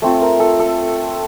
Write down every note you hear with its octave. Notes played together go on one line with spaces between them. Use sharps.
A3 C4 F4
A#4
A4
A4